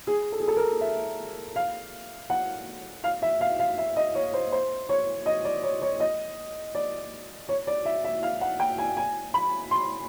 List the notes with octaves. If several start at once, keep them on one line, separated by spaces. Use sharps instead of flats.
G#4
A4
G#4
A4
A#4
E5
F5
F#5
F5
E5
F5
F5
E5
D#5
C#5
C5
C5
C#5
D#5
D5
C#5
C#5
D#5
D5
C#5
D5
E5
E5
F5
F#5
G5
G#5
G#5
B5
C6